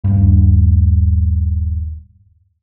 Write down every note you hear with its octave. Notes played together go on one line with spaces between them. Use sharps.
D#1 G2